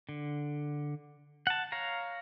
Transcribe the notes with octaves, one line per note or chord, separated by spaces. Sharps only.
D3
F#5 A5
C#5 F5 A#5